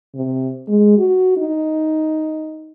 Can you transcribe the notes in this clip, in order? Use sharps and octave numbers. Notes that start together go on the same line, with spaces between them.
C3
G#3
F#4
D#4